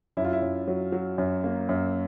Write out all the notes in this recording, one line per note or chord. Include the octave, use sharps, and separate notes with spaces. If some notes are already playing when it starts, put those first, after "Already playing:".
F#2 E4
F4
E4
F#2
F#3
F#3
F#2
A#3
F#2